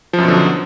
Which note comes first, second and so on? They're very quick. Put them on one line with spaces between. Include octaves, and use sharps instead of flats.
F3 F#2 B2 D3 F#3